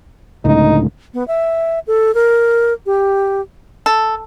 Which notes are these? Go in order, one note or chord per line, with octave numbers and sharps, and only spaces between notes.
C#2 A2 D3 D#4
B3
E5
A4
A#4
G4
A4